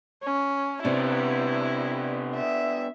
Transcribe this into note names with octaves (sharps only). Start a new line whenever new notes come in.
C#4
C3 B3 D4 E4
E5